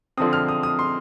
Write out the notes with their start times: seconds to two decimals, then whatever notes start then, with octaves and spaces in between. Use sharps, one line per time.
0.17 D3 F3 C4 D#6
0.33 F6
0.48 D#6
0.63 D#6
0.79 C6